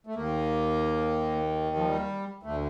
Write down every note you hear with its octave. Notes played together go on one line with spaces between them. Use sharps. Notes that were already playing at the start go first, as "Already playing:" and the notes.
A3
D#2 D#3 A#3
F3
G3
D2 D3 A3